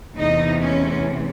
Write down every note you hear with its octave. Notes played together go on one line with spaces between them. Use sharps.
E2 C3 E3 A3 D#4
C#4